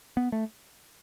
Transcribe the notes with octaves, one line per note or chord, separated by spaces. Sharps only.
B3
A3